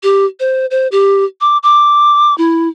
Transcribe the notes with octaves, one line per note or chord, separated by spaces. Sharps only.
G4
C5
C5
G4
D6
D6
E4